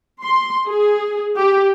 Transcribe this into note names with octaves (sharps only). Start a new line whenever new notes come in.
C6
G#4
G4